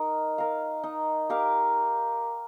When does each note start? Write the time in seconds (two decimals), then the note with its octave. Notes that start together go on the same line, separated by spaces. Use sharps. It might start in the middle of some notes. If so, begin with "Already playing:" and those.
Already playing: D#4 A#4
0.38 A#4 F5
0.83 D#4
1.29 G4 A#4 F5